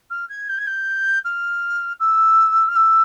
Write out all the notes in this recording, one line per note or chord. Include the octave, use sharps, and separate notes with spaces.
F6
G#6
G6
G#6
G6
F6
E6
F6
E6